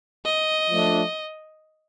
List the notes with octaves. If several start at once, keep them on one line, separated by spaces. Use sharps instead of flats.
D#5
F3 A3 D4